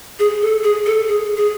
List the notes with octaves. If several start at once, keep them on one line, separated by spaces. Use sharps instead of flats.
G#4
A4
G#4
A4
G#4
G#4